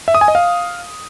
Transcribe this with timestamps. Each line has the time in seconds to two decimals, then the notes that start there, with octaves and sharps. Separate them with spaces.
0.08 E5
0.15 D#6
0.21 G#5
0.28 D#5
0.35 F5